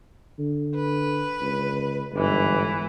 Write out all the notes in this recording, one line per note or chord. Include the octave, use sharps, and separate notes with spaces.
D3
B4
C#2
G1 G#2 E3